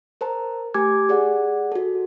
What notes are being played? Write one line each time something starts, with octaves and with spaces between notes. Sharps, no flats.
A#4 C5 A5 A#5
A3 G4 G#5 D6 G#6
G#4 D5 F#5
F#4 A4